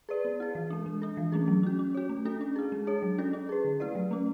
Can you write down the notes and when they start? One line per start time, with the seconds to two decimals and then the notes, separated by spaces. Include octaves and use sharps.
0.09 G#4 B4 D5
0.25 B3
0.40 E4 G#4
0.55 E3
0.70 G#3 D4
0.86 G#3
1.02 D4 A4
1.17 E3
1.32 A3 C#4 G#4
1.48 F#3
1.63 C#4 F#4
1.79 C#4
1.94 F#4 C#5
2.09 A3
2.25 D4 F#4 A4
2.41 C#4
2.56 E4 G#4
2.72 G#3
2.87 D4 G#4 C#5
3.02 F#3
3.18 C#4 F#4 A4
3.33 C#4
3.49 G#4 B4
3.64 D3
3.80 A3 E4 B4 D5
3.95 F#3
4.11 A3 C#4